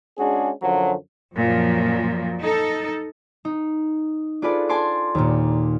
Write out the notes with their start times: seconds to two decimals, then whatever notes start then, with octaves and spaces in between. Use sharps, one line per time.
0.18 G#3 C#4 D4 F#4 G#4
0.62 F#2 D3 F3 F#3
1.34 F#2 A#2 F3
2.42 D#4 A4
3.45 D#4
4.42 D4 F4 G#4 A4 B4 D5
4.69 G#5 A5 C6 D6
5.15 D#2 A#2